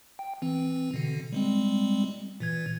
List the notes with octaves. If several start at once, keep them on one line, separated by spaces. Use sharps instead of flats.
G5
E3 C4
B2 D3
G3 G#3 C4
A#2 E3 G#6